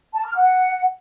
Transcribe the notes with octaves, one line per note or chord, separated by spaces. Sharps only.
A5
F6
F#5